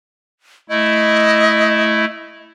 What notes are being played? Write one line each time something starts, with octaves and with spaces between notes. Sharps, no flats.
A3 E4 D#5